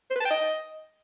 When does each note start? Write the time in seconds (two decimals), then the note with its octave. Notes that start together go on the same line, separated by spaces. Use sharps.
0.10 C5
0.15 B4
0.20 A5
0.25 G5
0.30 D#5